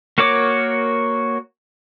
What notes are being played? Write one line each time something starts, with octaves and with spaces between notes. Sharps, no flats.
A#3 F#4 A#4 C#5 D6